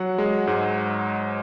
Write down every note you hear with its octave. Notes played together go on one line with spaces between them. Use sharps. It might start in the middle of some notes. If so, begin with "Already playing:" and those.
Already playing: F#3 F#5
G#3
G#2